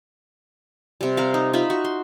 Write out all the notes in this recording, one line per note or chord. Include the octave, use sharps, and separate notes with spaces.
C3 G3
C4 A#4 F5
D#4
D#4 F4 E5 B5
F#4
C6